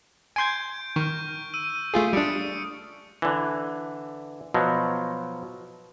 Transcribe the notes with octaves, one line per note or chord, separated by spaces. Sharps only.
G#5 C6 G6 G#6 D7
D#3 C#6 F6
E6 D#7
A3 F4 G#4
G3 D4 D#6 C#7 D7
D3 E3
B2 F3 F#3